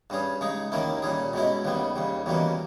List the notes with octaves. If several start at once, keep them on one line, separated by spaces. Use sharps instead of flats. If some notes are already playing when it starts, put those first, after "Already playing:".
G2 G3 C#4 G#4
C#3 G#3 D#4 G#4
D#2 D#3 A#3 C#4 E4
A#2 G3 C#4 G#4
B2 G#3 C#4 E4
D#2 C#3 G3 B3
D#2 C#3 G3
E2 B2 G3 A#3 C#4